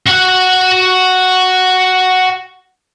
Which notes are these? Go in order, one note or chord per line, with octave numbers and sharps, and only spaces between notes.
F#4 F#5